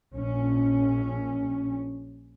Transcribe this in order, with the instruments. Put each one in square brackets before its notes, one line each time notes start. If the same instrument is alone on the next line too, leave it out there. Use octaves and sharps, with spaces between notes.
[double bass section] A#1 C#4